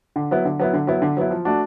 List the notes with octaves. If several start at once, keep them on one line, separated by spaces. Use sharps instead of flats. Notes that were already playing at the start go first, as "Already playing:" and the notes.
D3
F#3 B3 E4
D3
F#3 B3 E4
D3
F#3 B3 E4
D3
F#3 B3 E4
F3
A3 D4 F#4